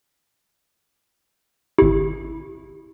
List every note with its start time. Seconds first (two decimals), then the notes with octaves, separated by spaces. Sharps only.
1.79 G#1 E4 G4